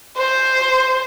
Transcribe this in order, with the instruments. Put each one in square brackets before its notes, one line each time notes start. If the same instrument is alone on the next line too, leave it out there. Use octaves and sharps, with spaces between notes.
[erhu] C5